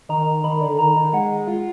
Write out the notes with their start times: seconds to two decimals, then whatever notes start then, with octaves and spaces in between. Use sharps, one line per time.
0.09 D#3 A#5
0.44 D#3 B5
0.61 D3
0.79 D#3 A#5
0.96 D#3
1.13 G#3 F#5
1.47 F4